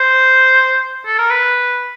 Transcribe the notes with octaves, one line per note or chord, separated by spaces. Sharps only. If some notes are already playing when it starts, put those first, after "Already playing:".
Already playing: C5
A4
A#4
B4